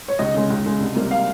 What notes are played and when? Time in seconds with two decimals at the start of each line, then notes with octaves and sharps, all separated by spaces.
0.08 C#5
0.19 C#2 D#5
0.34 C#3 G#3
0.50 C#2
0.65 C#3 G#3
0.80 C2
0.95 C3 G3 A#3
1.11 F5